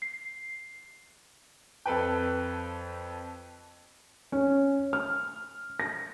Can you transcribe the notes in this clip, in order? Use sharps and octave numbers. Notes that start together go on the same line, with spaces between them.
C7
F2 A4 B4 G5
C#4
F6
A#6